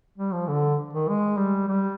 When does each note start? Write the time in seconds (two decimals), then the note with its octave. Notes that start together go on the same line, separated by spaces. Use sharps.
0.18 G3
0.32 F3
0.48 D3
0.93 D#3
1.08 G#3
1.37 G3
1.68 G3